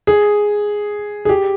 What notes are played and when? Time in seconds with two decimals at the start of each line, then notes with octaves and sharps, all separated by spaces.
0.07 G#4
1.25 G#4
1.29 G4